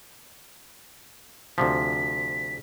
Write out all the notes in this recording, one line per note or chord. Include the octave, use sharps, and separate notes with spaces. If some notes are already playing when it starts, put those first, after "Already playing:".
D2 C3 F3 B6